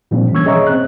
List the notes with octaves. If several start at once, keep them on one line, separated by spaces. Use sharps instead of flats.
A#2 F3 G3 A#3 C4 D4
E3 A#3 C#4 C#6 E6 G#6
G#4 C#5 D#5 E5 A#5 C#6
C4 F#6